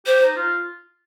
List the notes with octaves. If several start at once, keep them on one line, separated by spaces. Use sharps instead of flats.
G4 C5
D#4
F4